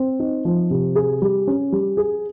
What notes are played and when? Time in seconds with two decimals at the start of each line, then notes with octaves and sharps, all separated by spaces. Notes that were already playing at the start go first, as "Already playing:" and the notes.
Already playing: C4
0.20 D#4
0.45 F3
0.71 C3
0.95 G#4
1.22 G3
1.47 C#4
1.72 G3
1.97 G#4